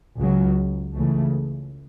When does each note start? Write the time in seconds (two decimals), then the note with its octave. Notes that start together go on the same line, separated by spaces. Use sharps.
0.19 C#2 C#3 F#3
0.95 C#2 C#3 E3 A3